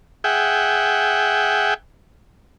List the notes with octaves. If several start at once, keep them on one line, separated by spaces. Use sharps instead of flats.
G#4 E5 F#5 G5